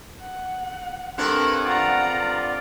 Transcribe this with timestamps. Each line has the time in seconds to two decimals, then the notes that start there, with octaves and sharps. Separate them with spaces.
0.21 F#5
1.18 G2 C4 A4 A#4 F#6 G#6
1.65 F4 D5 F#5 A#5